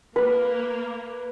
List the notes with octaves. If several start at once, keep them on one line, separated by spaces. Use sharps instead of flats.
A#3 B4